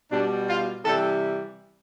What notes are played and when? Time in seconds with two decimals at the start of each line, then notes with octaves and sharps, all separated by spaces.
0.11 B2 G3 D4
0.48 F4
0.85 C3 E3 G3 A4